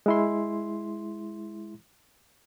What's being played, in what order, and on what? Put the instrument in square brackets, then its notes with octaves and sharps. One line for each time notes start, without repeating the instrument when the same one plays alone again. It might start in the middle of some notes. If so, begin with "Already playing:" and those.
[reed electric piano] G#3 E4 C6